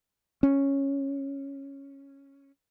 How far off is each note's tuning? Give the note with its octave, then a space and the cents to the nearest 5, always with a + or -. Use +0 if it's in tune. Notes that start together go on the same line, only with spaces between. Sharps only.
C#4 -5